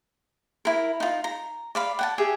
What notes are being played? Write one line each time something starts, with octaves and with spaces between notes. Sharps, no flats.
E4 A#4
D#4 F4
A#5
D5 F5 B5
F#5 G5 A5
G4 G#4 E5